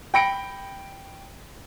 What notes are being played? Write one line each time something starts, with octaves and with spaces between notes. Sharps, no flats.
G5 B5 A#6 C#7 D7